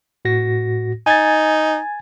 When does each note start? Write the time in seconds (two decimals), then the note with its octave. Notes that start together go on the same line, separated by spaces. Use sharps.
0.25 A2 F#4 A#6
1.06 D#4 G#5 G#6 A6